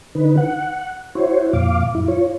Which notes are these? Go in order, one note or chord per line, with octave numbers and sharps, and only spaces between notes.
D3 D#4 B4
F#5
E4 F#4 C5 C#5
F2 A#2 F5 D6
F#2 E4
F4 C#5